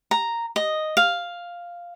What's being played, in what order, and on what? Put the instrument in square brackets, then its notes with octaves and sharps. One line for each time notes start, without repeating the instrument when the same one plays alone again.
[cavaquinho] A#5
D#5
F5